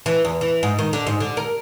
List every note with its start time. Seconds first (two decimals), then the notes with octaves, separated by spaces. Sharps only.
0.06 E3
0.25 E2
0.41 E3
0.63 G#2
0.79 D#3
0.93 D3
1.07 G#2
1.20 D3
1.37 A#4